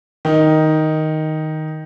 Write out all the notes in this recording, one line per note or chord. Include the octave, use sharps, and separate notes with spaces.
D#3 D#4